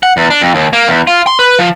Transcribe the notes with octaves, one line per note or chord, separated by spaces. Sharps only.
F#5
E2
D4
F2
D#2
A#3
E2
F4
C6
B4
F3